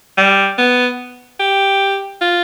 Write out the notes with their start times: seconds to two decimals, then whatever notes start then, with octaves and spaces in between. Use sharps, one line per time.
0.17 G3
0.58 B3
1.40 G4
2.21 F4